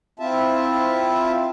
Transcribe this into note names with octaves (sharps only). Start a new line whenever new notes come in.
C4 E4 F4 E5 A5